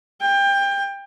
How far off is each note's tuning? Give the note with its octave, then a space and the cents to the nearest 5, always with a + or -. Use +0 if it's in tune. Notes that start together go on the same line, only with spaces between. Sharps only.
G5 +25